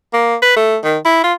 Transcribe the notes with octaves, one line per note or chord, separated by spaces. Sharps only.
A#3
B4
A3
D#3
E4
F4